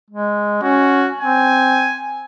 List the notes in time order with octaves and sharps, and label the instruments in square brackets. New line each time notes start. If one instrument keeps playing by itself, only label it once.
[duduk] G#3
[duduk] C#4 [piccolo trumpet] F#4
[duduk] C4 [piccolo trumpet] G#5